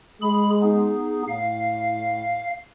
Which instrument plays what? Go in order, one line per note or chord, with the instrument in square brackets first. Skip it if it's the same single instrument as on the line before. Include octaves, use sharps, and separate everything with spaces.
[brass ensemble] G#3 [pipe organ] G#4 B5
[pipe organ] B3 D#4 G#4
[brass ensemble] A2 [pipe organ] F5